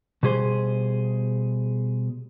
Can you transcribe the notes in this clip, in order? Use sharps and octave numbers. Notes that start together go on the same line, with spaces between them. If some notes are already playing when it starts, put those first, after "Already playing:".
B2 G3 G#4 C5